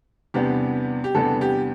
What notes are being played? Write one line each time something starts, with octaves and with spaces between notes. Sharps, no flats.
E2 C3 G3 B3 D4 G4
G4
E2 C3 G3 B3 D4 A4
G4